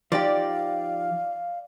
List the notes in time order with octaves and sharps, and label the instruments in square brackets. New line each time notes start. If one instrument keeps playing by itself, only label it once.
[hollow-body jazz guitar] F3 D#4 G4 [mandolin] D5 [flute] F5